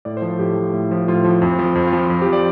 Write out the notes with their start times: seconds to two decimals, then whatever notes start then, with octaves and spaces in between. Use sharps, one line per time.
0.05 A2 D5
0.17 C5
0.22 F3
0.29 A4
0.39 A2 G4
0.56 F3
0.73 A2
0.91 F3
1.08 A2 F4
1.24 F3
1.42 F2
1.59 F3
1.75 F2
1.87 F4
1.93 F3
2.10 F2
2.22 G4
2.27 F3
2.33 D5